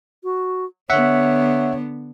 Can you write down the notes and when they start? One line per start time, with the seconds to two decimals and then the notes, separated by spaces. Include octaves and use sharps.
0.24 F#4
0.90 D3 B3 C#5 E5 F#5